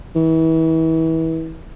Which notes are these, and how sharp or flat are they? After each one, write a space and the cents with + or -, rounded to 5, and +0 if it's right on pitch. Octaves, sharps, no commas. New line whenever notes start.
E3 -30